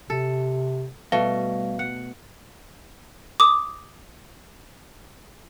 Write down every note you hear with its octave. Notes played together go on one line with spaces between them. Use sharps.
C3 A4
B2 G3 A3 F5
F#5
D6 D#6